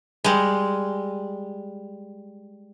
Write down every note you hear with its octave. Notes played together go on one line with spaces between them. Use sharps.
G3 G#3